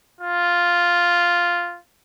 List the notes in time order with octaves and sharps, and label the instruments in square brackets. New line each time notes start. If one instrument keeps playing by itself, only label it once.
[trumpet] F4